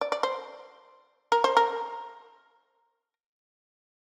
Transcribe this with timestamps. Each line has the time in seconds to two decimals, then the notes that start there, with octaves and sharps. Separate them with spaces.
0.01 D5
0.12 D5
0.23 C5
1.32 A#4
1.44 C5
1.57 A#4